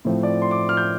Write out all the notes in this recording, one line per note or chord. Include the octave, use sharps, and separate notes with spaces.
A2 F3 A3 C4
D5
C6
D6
F6
G6